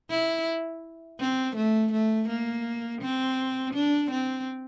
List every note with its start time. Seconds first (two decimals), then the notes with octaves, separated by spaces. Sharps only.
0.11 E4
1.20 C4
1.56 A3
1.93 A3
2.29 A#3
3.02 C4
3.74 D4
4.11 C4